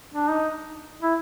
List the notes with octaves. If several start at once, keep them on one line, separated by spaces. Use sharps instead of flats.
D4
D#4
E4